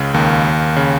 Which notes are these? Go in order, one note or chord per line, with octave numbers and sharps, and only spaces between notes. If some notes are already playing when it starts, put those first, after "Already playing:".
Already playing: C#2 C#3
D#2 D#3
C#3